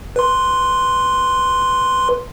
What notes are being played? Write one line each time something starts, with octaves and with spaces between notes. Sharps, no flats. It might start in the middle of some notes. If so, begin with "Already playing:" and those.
B4 C6